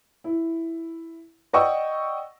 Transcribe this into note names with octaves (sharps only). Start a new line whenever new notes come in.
E4
D5 D#5 F#5 G5 C#6 E6